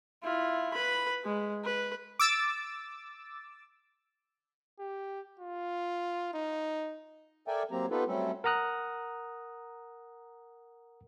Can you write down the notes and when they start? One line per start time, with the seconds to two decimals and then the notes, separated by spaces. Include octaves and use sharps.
0.23 E4 F4
0.74 B4 B5
1.24 G#3
1.64 B4
2.19 D6 E6 A6
4.79 G4
5.39 F4
6.34 D#4
7.48 A4 A#4 D5 E5 G5 G#5
7.72 F#3 A#3 C4 G4 A#5
7.91 B3 D#4 F4 G4 A4 B4
8.07 F#3 G3 A3 C4 C#4 A4
8.44 A#4 F#5 A#5 D#6 F#6